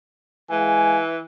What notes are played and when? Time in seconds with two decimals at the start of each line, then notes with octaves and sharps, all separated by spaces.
0.51 E3 G#3 F5 G#5